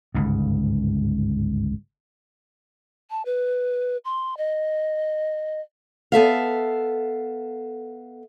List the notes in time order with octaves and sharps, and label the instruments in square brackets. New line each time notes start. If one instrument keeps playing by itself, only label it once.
[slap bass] G1 C#2 G#2
[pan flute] A5
B4
C6
D#5
[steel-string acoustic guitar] B3 A4 E5 F5